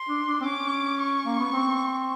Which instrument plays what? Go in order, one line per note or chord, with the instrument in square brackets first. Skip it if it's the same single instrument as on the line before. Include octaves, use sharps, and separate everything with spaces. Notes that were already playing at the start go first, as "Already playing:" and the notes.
Already playing: [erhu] C6
[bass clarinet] D4
D4
C4
[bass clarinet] C#4 [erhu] D6
[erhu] C#6
[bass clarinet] A#3
B3
C4